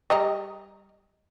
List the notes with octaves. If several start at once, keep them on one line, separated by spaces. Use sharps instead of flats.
G3 D#5 A#5